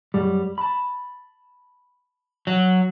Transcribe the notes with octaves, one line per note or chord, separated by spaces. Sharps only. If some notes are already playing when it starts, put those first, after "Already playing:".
F#2 G3
A5 B5
F#3